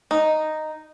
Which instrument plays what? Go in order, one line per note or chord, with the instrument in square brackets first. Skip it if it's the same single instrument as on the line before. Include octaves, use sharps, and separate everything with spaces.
[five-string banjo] D#4